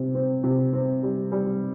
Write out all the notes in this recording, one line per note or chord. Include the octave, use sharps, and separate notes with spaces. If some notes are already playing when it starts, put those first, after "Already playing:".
Already playing: C3
C4
C3
C4
G3
G3